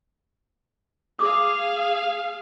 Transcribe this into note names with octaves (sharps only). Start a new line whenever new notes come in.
G#4 F5 D6 D#6